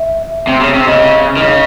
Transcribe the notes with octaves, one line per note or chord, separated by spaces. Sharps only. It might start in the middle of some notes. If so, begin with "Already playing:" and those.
Already playing: E5
C3
C#3
C3
C#3 D#5
D#3
C#3